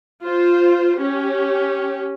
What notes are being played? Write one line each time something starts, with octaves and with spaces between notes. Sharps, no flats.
F4 C5
C#4 G4